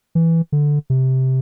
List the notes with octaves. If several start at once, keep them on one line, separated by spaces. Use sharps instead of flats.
E3
D3
C3